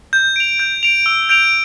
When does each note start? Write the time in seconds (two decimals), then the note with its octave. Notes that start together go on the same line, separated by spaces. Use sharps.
0.13 G6
0.36 D7 F7
0.59 G6
0.83 D7 F7
1.06 E6
1.29 G6 D7 F7